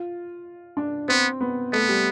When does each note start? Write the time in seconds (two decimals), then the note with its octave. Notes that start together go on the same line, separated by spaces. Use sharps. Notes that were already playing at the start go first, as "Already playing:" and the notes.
Already playing: F4
0.77 D4
1.08 B3 C4
1.41 B3
1.73 A3 B3
1.89 G3